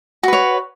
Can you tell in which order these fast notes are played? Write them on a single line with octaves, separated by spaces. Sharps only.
F#4 B4 C#5